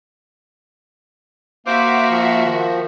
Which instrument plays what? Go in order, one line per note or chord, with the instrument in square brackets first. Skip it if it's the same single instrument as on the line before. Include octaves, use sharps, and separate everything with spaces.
[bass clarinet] A#3 [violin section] F#4 E5 [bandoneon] C5 D6 [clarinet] F5
[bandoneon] F3
[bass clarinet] D#3